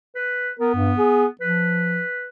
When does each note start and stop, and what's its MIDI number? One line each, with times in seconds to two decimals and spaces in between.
0.16 0.49 71
0.60 1.26 59
0.60 0.73 70
0.75 0.93 43
0.98 1.26 68
1.41 2.01 53
1.41 2.28 71